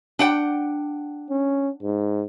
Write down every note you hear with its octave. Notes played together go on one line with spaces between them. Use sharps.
D4 F#5 G5
C#4
G#2